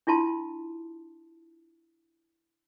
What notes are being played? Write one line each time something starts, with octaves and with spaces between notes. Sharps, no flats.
D4 E4 F4 A5 C6